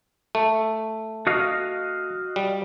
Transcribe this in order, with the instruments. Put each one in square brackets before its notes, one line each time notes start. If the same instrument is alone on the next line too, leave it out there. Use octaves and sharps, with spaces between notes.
[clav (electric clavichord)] A3
[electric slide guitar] F#4 D#5 F5
[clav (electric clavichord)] G3